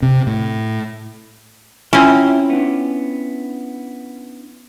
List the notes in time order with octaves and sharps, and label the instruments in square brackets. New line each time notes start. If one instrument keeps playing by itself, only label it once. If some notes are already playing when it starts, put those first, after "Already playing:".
[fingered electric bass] C3
A2
[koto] C4 C#4 [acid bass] E4 [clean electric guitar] F4 G5 A#5
[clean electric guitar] B3 D4